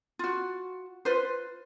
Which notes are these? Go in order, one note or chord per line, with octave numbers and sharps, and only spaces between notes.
F4 F#4
F4 B4 C5